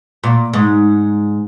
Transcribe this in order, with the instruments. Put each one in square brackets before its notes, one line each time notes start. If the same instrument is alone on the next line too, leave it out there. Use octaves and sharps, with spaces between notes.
[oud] A#2
G#2